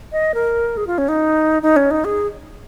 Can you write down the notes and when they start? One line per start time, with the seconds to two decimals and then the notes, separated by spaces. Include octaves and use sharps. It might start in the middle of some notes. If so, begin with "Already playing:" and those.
0.12 D#5
0.34 A#4
0.77 G#4
0.87 F4
0.98 C#4
1.08 D#4
1.63 D#4
1.76 C#4
1.91 D#4
2.05 G#4